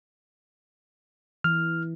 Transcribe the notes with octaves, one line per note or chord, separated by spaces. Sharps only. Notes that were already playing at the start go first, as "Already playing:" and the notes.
E3 F6